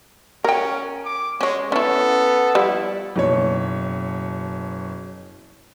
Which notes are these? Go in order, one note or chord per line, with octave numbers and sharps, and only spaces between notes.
C#4 A#4 G5
D6
G#3 C#4 C#5
B3 C#4 E4 A4
F3 G3 E4
F#1 B2 C#5